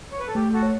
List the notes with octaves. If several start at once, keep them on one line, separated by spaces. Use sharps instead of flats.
C#5
B4
A4
A3 G4
F#4 A4
C#5